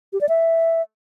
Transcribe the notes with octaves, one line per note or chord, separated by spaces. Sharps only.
G4
D5
E5